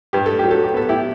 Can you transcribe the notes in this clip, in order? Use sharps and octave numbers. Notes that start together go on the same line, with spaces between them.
G2 G4
A4
F#3 G4
A4
G4
B3 A4
E4 G4